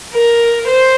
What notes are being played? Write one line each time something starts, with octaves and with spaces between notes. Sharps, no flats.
A#4
C5